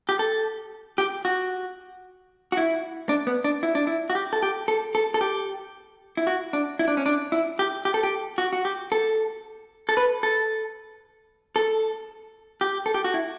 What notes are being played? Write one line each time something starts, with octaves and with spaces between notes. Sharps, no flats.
G4
A4
G4
F#4
F#4
E4
D4
B3
D4
E4
D4
E4
F#4
G4
A4
G4
A4
A4
A4
G4
E4
F#4
D4
E4
D4
C#4
D4
E4
G4
G4
A4
G4
F#4
F#4
G4
A4
A4
B4
A4
A4
G4
A4
G4
F#4
E4